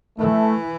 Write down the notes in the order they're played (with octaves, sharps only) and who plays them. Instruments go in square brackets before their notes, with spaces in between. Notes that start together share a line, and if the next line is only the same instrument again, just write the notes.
[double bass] E3 [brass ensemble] A3